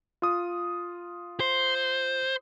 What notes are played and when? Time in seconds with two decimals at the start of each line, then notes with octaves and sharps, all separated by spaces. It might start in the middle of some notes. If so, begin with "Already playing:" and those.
0.22 F4 D#6
1.40 C5